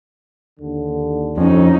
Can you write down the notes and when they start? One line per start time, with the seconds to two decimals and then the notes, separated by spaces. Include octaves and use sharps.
0.60 D#2 D3
1.37 F2 C#4 D#4